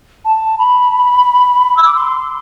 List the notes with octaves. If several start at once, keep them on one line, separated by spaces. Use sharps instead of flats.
A5
B5
E6
D6
C6